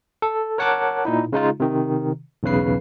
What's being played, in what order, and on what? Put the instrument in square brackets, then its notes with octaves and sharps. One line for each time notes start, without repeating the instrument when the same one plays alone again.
[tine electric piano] A4
A#4 C#5 F#5 A5 D6 F#6
A#2 D#4 E4
C#3 G#3 D#4 F4
C3 D#3
B1 E2 C#3 B4 C7